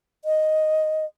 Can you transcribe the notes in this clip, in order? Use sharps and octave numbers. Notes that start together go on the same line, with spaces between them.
D#5